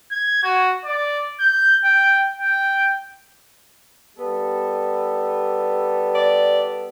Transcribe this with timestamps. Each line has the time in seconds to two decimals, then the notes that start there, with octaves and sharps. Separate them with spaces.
0.11 G#6
0.43 F#4
0.85 D5
1.40 G6
1.84 G5
2.37 G5
4.17 G3 B3 A4
6.15 D5